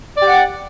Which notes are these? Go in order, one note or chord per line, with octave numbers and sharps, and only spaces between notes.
G4 D5 F#5